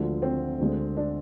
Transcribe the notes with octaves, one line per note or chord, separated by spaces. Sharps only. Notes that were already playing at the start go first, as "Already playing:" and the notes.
Already playing: D2 D3 F3 G#3
C4
D2 D3 G#3
D4